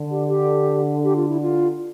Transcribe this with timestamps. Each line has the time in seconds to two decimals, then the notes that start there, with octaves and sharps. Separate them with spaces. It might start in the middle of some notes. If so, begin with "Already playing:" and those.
Already playing: D3
0.11 G4
0.28 G4
1.04 G4
1.16 F4
1.29 E4
1.41 F4